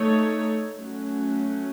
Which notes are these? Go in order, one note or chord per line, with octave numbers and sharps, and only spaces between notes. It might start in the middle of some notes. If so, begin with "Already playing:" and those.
Already playing: A3 D#4 A4 C#5
F#3 A3 C#4